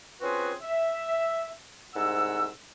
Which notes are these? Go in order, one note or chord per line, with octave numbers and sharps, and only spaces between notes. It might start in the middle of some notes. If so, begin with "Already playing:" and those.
C4 C#4 F4 F#4 G#4 B4
E5
C2 G#2 F#5 E6